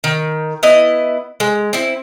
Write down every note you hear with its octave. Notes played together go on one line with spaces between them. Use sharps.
D#3
B3 E4 D#5
G#3
C4 E4